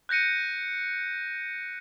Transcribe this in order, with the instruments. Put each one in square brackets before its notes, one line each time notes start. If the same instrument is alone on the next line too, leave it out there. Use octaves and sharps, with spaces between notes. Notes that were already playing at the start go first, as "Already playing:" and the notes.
[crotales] F#6 G6 A#6 C#7 D#7